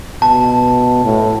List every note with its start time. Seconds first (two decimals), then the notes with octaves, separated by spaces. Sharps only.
0.22 B2 A5
1.04 A2